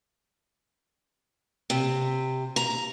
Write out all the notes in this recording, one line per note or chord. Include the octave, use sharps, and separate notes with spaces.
C3
A#5